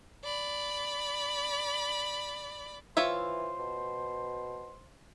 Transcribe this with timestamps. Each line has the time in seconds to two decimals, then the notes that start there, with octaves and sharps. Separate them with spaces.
0.24 D5 B5
2.97 E3 F4 C5 C#5 E5
3.59 B2